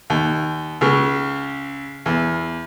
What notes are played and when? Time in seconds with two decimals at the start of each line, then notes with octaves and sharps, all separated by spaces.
0.10 D#2
0.81 C#2 C#3
2.06 E2